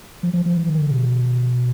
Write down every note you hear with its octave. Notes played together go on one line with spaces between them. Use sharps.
F3
F3
F3
E3
D#3
D3
B2